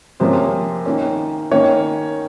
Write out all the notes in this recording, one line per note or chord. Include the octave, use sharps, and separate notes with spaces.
C3 F3 A#3 C#4 C5
D#3 A#3 C#4
D#3 A#3 C#4 C#5